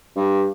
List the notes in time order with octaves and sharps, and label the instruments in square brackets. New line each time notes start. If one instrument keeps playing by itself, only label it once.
[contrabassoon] G2